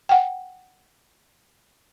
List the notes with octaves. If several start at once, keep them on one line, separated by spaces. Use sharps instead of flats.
F#5 G5